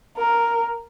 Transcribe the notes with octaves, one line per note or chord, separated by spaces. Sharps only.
A#4